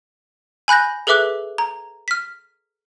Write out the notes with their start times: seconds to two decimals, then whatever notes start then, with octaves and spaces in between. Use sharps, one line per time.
0.68 G#5 B5 F#6 G6 A#6
1.07 G#4 A4 B4 E5 D6 F#6
1.58 A#5
2.08 F6 B6